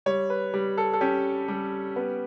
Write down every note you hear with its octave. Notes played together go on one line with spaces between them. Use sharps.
G3 C#5
B4
G3
A4
A4
C#4 G4
G3
B3